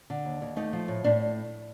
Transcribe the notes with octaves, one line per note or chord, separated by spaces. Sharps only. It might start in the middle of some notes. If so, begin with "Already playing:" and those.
D3
D#2
D#2
A3 D#4
F3
A2
A2 D4